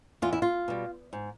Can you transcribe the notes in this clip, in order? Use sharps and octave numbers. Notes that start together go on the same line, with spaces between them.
E2 F4
E4
F4
B2 G3
G#2